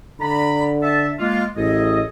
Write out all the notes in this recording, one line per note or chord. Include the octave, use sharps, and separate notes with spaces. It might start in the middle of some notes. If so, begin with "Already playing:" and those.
D3 D5 A#5 B5
A4 E5 A5
G#3 A#3 F4
A1 G#4 A4 D#5